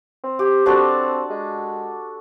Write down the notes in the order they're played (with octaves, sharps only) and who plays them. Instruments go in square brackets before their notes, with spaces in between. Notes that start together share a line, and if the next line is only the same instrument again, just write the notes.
[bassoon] C4
[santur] G4
[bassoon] C4 [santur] D4 F#4 A4
[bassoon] G#3